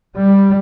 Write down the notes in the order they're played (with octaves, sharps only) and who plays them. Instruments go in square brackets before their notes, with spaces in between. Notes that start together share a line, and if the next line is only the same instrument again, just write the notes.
[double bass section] G3